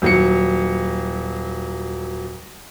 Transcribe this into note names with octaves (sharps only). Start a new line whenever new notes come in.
D#1 F#3 C#7